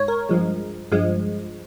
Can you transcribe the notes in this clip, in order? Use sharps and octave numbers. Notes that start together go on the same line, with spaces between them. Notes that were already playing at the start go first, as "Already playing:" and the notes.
Already playing: G#2 C#5
A#4
G2 F3 G#3
G2 F3 G#3